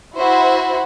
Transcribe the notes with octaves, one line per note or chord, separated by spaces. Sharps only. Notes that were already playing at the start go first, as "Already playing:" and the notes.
E4 F#4 C5